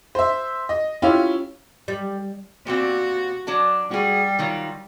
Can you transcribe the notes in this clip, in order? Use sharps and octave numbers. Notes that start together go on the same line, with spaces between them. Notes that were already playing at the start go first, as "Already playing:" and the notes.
C5 E5
D#5
C#4 E4 F4 G4
G3
A#2 G3 C4 F#4
F#3 D4 A5
G3 F#4 G#4
D#3 F#3 F4